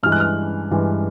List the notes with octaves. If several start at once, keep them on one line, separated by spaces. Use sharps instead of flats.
G2 E3 G#3 F6
F#6
F6
G2 E3 G#3